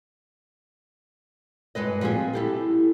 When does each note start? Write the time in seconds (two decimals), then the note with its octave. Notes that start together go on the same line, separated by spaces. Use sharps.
1.75 G2 G#3 B4 D#5
2.01 F3 G3 C4 F#4 G#4
2.33 E4 G4 A4